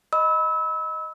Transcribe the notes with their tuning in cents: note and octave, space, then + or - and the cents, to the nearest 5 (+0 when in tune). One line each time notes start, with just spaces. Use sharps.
D#5 +0 B5 +0 E6 -30